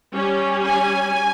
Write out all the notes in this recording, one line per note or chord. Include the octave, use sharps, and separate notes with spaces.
G3 C#4
G#5